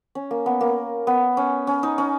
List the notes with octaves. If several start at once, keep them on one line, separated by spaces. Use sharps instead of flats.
C#4
A#3
B3
A#3
B3
C#4
C#4
D#4
C#4